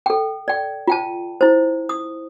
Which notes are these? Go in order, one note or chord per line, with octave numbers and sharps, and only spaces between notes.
A4 G5
D5 G5
F4 G5 A5
E4 C5
D#6